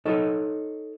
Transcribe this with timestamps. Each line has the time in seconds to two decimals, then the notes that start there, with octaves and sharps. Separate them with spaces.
0.05 D#4 A4 C#5 D#5